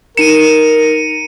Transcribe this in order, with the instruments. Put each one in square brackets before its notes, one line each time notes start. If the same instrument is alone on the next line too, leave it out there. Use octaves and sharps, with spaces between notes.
[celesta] D#4 E7 [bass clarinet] A#4 [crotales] C#7 D#7